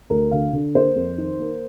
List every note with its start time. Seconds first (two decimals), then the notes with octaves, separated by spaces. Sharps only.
0.10 D2 A#4
0.31 D3 F5
0.53 D3
0.75 A#3 C5
0.96 F2
1.18 D#3
1.40 A#3